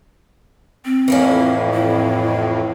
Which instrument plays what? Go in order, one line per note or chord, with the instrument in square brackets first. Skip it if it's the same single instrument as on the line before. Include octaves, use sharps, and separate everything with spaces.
[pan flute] C4
[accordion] F2 A2 [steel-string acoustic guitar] E3 A#3 C#4
[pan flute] E4